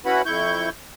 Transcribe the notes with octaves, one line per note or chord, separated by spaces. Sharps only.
C#4 E4 F#4 B4 F#5 B5
F2 E4 C#6 G6